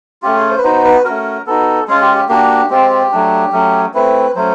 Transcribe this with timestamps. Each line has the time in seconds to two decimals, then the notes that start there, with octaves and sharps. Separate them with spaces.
0.22 A3 C#4 F4 G4
0.36 G#4
0.50 C5
0.58 B4
0.63 B3 D#4 F#4 C5
0.84 B4
1.04 A3 C#4 F#4 A#4
1.47 B3 D#4 F#4 A4
1.88 G#3 C#4 F4 G#4
2.01 G4
2.15 G4
2.29 A#3 D4 F#4 G4
2.70 G#3 C4 F4 G4
3.12 F#3 A3 D4
3.52 F#3 A3 C#4
3.94 A3 C4 E4 B4
4.35 F#3 A3 C#4 C5